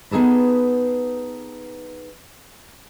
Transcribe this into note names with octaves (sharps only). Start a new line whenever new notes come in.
B3 D#4 G#4 A4 B4